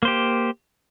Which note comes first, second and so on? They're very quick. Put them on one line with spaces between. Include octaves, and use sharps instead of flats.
A#3 C5 G4